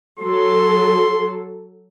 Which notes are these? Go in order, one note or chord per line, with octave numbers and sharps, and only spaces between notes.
F#3 A4 C6